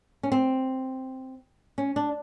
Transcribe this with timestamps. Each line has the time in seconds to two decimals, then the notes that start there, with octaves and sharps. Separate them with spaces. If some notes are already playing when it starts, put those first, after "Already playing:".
0.23 C#4
0.32 C4
1.78 C#4
1.96 D4